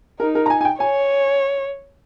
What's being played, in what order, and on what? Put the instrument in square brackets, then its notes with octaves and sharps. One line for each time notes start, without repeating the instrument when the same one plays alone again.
[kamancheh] D#4 [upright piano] A#4
[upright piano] A#4
A#5
G#5
G#5
G5
[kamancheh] C#5 [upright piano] G#5